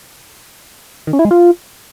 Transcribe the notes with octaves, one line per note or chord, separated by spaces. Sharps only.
D#3
C#4
E4
G#3
F4